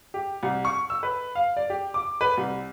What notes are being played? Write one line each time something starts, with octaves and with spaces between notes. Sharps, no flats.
G4
C2
C#6
E6
B4
F5
D5
G4
D6
B4
C2